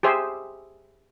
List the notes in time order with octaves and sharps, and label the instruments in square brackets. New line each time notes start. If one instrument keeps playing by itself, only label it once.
[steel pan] G4 G#4 C5 E5